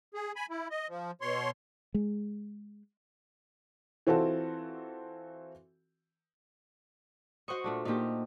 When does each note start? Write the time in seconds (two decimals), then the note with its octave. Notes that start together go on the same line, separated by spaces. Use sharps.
0.14 G#4
0.36 G#5 B5
0.50 E4
0.70 D#5
0.89 F3
1.21 B2 C#5 C6
1.94 G#3
4.07 E3 C4 F4 F#4 A4
7.48 F#4 C5 D#5 F#5 C#6
7.64 A#2 A3 D4
7.85 A#2 A3 A#3 D#4 G4